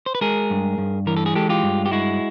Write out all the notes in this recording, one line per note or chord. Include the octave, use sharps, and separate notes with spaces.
C5
B4
G#3 G#4 A#4
G2
G2
E3 A#4
A4
G#4
G#3 G4 A4
F4 G4
G2
G4
G#3 E4 F#4